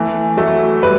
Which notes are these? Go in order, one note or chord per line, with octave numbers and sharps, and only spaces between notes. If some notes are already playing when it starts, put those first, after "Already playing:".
Already playing: E3 A3
F#3 A3
G3 B4